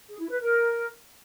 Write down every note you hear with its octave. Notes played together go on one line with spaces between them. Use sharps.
G#4
E4
B4
A#4